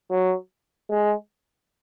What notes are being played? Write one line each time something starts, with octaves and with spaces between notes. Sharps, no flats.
F#3
G#3